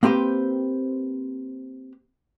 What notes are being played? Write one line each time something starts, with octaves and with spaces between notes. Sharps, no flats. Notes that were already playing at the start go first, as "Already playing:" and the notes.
A#3 C4 G4 B4 C5